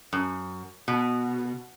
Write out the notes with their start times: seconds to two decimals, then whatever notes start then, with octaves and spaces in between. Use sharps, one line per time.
0.13 F#2
0.88 B2